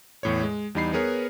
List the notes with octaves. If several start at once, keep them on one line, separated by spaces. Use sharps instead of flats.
E2 A2 C#5
G#3
E2 G3 D#4 B5 C7
B3 G#4 A#4 B4 C#5